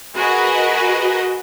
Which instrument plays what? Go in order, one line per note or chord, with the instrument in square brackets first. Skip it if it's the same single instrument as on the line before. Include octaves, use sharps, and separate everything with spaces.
[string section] F#4 G#4 A#4 B4 D#5